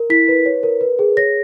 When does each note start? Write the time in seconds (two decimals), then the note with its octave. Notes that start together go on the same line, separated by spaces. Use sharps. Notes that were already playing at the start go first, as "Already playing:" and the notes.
Already playing: A#4
0.10 E4 B6
0.28 B4
0.46 C#5
0.63 A#4
0.81 B4
0.99 G#4
1.17 C#5 A#6